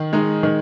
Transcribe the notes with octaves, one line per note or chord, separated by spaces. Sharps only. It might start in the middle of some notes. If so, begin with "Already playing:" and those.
Already playing: D#3
G#3 D#4
D#3